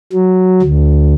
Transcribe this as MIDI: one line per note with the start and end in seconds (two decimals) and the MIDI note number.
0.13 0.62 54
0.62 1.14 38